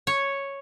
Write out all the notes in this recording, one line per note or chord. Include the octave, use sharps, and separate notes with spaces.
C#5